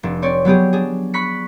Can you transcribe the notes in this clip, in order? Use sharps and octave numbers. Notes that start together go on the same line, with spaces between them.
F1 D4
C4 C#5 D5
F#3 B3 G4 G#4
D4 G#4
B5 C#6 F#6 B6 C#7